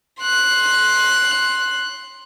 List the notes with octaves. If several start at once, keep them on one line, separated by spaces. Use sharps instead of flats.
C6 F#6